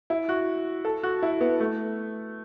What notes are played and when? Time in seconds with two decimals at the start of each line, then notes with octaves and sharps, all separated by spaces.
0.10 E4
0.29 F#4
0.85 A4
1.03 F#4
1.23 E4
1.41 B3
1.60 A3